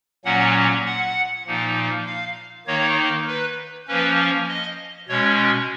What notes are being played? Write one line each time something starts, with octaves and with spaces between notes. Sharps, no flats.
A#2 F#3 A#3 C#4 F#5
F#5
A#2 F3 A#3 D#4
F5
D#3 A#3 D#4 C#5
B4
F3 A#3 C#4 B4
D#5
B2 G#3 C#4 C#5